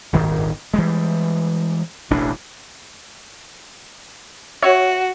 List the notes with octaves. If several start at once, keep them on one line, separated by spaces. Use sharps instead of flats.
D#1 G#1 G2 D#3
E3 G3 G#3
E1 A1 E3 D4
F#4 C#5 E5